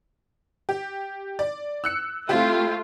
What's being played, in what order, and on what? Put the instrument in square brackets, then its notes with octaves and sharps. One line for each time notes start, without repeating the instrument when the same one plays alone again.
[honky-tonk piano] G4
D5
E6 F#6 C#7
[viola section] A3 F4 [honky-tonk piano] C4 E4 G4